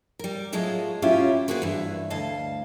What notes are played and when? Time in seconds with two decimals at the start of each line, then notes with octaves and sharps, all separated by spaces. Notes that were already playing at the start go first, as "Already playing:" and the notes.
0.19 G3 A#4
0.52 A2 F#3 G#3 F4 D#5 A5
1.02 B2 F#3 C#4 E4 F4 G4
1.48 A#3 F#4 G#4 B4 C5
1.62 G2 E3
2.10 D2 D#5 F5 A5